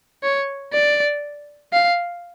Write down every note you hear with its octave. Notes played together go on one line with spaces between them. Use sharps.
C#5
D5
F5